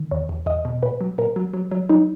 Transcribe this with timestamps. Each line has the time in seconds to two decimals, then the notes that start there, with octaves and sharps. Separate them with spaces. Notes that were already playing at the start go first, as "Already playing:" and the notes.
Already playing: D#3
0.11 E2 C#5
0.29 E2
0.46 E2 D#5
0.65 B2
0.82 A#2 B4
1.01 F#3
1.18 A#2 A#4
1.36 F#3
1.54 F#3
1.71 F#3
1.89 F#3 D#4